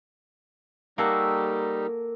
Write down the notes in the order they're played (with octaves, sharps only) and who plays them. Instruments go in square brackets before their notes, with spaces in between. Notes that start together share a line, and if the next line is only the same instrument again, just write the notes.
[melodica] G3 D#4 G4 [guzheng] A#3 F#4 A4